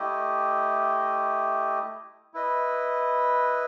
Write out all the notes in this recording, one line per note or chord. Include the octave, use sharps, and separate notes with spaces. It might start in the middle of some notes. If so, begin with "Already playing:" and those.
Already playing: A3 E4 G4 D#5
E4 B4 D#5